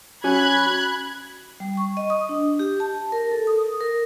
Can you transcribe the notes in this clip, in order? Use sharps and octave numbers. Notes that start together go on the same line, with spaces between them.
C#4 F#4 G#5 B5 F#6 G#6
G3
C#6
D#5
D#6
D4
G4
A5
A#4
A4
D#6
A#4